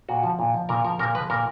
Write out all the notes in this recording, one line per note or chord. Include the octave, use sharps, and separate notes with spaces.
A#2 F#4
F3
A#2
F3
A#2 A#4
F3 A#4
A#2 A#4
F3 B4
A#2 A#4